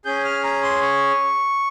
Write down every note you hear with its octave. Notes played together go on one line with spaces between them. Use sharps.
C#4 G#4 G6
F6
A#5
C6
C#6